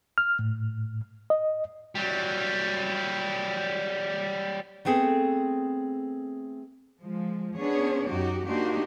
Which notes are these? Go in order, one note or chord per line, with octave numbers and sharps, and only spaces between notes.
F6
A2
D#5
F#3 G3
A3 B3 C4 G#4 A4
F3 G#3
B3 C#4 D4 G#4 C#5
F#2 D#4 F#4 G4
A#3 D4 D#4 F#4 G4 C5